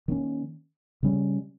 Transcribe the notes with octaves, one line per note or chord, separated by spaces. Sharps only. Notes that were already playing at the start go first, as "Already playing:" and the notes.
D#3 A#3 C#4
C#3 G3 C#4